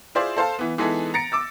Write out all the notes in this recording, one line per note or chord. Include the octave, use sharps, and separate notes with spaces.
E4 F4 G#4 C5 D5
A4 C5 F5 A5
E3 B3
E3 G#3 B3 D#4 G#4 A4
A#5 A6 A#6 C#7 D7
D6 E6 A6